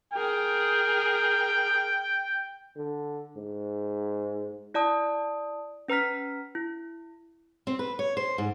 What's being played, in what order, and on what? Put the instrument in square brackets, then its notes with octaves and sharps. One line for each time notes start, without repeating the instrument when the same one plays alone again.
[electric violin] G#4 A#4 [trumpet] G5
[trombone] D3
G#2
[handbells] E4 D5 A5 D#6
C#4 B4 A#5 F6 B6
E4
[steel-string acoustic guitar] C4
B4
C#5
C5
G#2